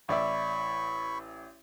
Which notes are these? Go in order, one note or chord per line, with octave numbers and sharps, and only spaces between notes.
A1 D5 E5 B5 C#6